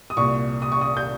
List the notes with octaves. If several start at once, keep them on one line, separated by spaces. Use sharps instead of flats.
D#6
C2 A#2 C#6
D#6
C#6
D#6
G6